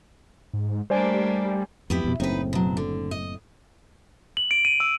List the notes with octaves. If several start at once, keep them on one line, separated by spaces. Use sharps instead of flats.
G#2
G3 A3 A#3 D4 C5 D5 G#5
F2 B3 E4 G4
F2 B2
F#1 A2 C4 D#4 B4
B2 F#3
D3
D#5
F#7
D7
D#7
E6